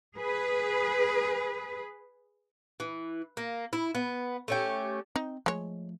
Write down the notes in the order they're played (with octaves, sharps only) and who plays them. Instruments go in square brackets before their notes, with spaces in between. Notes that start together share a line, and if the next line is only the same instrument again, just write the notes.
[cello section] G#4 B4
[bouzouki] E3
A#3
E4
B3
A3 C#4 G4
[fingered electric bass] C4 [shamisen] D#4
[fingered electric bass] F3 A3 [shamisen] G#3 C#5